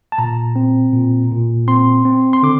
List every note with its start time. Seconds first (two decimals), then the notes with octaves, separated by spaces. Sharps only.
0.12 A5
0.18 A#2 A#5
0.56 C4
0.93 A#2
1.31 A#2
1.68 C4 C6
2.05 C4
2.33 C6
2.43 D3 D6